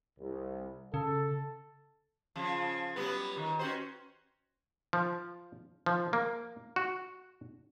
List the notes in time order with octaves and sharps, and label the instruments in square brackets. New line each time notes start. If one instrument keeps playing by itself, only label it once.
[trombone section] C2
[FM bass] C#3 [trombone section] A4
[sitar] C#3 F3
F#3 G3 B3
D#3
C#4 F#4 C5
[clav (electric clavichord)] F3
F3
A#3
F#4